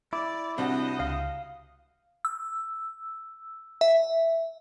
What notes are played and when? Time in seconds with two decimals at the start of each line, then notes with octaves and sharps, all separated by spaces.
0.13 E4 D5 D6
0.58 C2 C4 D4 F#4 D#5 F#5
1.00 C#2 F5 D#6
2.25 E6
3.81 E5